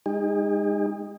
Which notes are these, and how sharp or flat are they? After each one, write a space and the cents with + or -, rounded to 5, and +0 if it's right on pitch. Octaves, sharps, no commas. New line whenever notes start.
G#3 -20 D#4 -5 G#4 -45